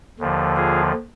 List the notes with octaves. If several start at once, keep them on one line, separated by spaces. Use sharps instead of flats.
D#2 D3 F3
F4 G#4